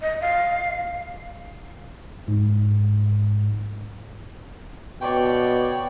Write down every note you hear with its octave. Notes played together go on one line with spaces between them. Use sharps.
D#5
F5
G#2
B2 C#5 D5 G5